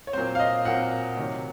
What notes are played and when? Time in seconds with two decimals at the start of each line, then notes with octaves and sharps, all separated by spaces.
0.07 C#5
0.13 A#2 F#3 C4 C5
0.35 F5
0.39 D#5
0.65 A#2 F#3 C4 F#5
1.17 C3 D#3 F#3